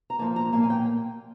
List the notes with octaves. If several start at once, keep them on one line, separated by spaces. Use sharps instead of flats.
A#5
A#2 F3 A#3 A5
A#5
A#2 F3 A#3 A5
G#5
G5